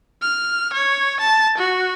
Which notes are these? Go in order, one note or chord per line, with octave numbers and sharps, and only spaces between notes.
F6
C#5
A5
F#4